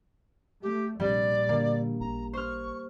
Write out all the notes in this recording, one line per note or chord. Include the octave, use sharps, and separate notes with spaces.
A3 G4
A#1 C3 G3 D5
D3 A#3
A1 A#5
C5 C#6 F6